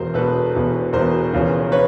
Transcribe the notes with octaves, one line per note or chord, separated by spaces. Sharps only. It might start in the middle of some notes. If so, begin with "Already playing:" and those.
Already playing: E1 E2 B2 A#4 C5
E1 E2 B2 A4 B4
E1 E2 B2
E1 E2 B2 A#4 C5
E1 E2 C#3 F3
B4 C#5